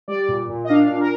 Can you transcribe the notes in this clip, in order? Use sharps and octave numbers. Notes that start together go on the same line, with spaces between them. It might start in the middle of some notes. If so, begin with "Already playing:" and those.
G3 D5
A#2
A#2
D#5
D4 F5
A#2
A#4